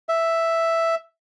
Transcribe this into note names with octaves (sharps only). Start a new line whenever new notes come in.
E5